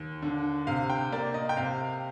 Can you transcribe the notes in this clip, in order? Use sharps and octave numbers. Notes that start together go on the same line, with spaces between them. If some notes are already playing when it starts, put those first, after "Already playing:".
Already playing: D#2
D3
C3 F5
G5
A#3 D5
D#5
G5
C3 F5